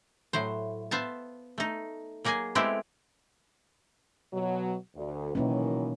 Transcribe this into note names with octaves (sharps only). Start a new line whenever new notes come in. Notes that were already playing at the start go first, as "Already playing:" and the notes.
A2 F#3 C5
B3 C5 E5 F5 A5
A3 D#4
F#3 A#3 G#4 D#5 G#5
G#3 A3 B3 C4 E4 G4
B2 F#3
D2
B2 D#3 E3 F#3 A#3 C#4